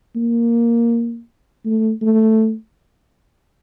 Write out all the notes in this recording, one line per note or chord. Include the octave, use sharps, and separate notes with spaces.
A#3
A3
A3